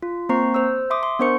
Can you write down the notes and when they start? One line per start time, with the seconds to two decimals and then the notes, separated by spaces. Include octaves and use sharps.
0.02 F4
0.29 A#3 C4 C5 A#5 C#6 C7
0.54 C5 E6
0.90 E5 C6 D6 D#6
1.03 C6
1.19 B3 D4 A#4 C5 C#6 C#7